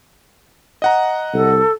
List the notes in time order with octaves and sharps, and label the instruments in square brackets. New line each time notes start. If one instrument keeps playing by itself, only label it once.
[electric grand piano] D#5 F#5 A#5
[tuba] C2 [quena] A4